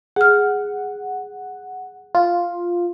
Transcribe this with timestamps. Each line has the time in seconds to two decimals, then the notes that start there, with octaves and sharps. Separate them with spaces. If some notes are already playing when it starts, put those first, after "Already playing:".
0.16 G#4 F#5 F6
2.15 F4